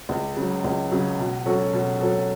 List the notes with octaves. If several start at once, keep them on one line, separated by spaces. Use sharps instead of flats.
C#2
C#3 F#3
C#2
C#3 F#3
B2
F#3 C#4 F#4 A4
B2
F#3 C#4 F#4 A4